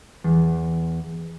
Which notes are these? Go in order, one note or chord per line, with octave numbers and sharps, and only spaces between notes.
E2